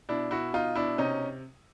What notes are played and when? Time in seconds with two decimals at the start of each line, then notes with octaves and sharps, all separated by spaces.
0.09 B2 D4 E4
0.31 B2 E4 F#4
0.53 B2 D#4 F4
0.75 B2 D4 E4
0.98 C3 C#4 D#4